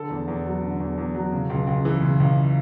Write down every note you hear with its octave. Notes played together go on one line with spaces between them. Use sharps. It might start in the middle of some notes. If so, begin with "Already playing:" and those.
Already playing: D3 A4
E2
E2
F#3
D3
E2
E2
F#3
C#3
C#2
C#2
E3
C#3
C#2